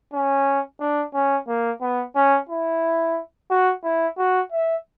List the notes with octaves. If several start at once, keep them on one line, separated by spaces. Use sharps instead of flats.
C#4
D4
C#4
A#3
B3
C#4
E4
F#4
E4
F#4
E5